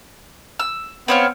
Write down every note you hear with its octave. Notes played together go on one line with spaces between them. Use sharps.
E6
B3 C4 C#5 F5